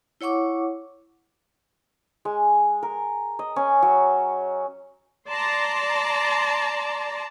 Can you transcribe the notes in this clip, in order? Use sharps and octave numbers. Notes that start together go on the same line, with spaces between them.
E4 C#5 F#5 C#6 D6
G#3
A#4
D#5
C#4
F#3
D5 A5 A#5 C6